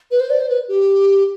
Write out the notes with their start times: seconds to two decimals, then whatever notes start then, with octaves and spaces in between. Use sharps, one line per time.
0.11 B4
0.20 C5
0.30 D5
0.40 C5
0.49 B4
0.68 G4